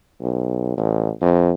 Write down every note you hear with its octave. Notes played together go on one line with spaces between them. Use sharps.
B1
A1
F2